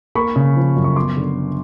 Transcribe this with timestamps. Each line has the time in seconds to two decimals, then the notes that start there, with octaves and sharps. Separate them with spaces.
0.15 A#3 B5 C#6
0.36 C#3
0.56 F3
0.76 F#2
0.84 C#6
0.96 B3 C6 D6
1.17 D3